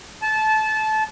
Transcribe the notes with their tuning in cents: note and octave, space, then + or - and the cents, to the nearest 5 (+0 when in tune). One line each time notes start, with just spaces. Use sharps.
A5 -20